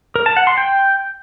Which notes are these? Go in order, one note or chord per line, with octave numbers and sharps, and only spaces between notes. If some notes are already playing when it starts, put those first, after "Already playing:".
A#4
A5
F#5
C6
G5